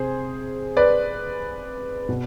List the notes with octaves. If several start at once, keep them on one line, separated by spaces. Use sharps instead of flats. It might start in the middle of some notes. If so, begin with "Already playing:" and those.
Already playing: C3 G#4 C5
B4 D5
B2